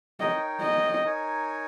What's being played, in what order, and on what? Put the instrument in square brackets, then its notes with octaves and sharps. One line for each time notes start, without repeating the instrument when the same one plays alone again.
[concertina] D#4 A#4 C#5 G5 [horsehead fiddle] D#5
[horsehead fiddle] D#5
[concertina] D#4 A#4 C#5 G#5